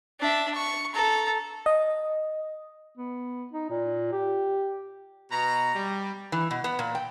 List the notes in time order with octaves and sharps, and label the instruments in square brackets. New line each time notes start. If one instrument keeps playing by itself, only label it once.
[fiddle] D4 E5
C#6
A4 A#5
[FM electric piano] D#5
[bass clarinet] B3
D#4
A#2
G4
[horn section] B2 A#5
G3
[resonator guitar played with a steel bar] E3
B2
B3
A#2
G5